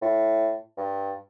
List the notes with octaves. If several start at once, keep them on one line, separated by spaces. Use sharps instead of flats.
A2
G2